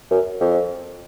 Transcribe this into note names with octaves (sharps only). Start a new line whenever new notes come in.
F#2
F2